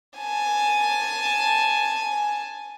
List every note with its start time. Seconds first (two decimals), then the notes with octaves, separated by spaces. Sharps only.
0.19 G#5 A5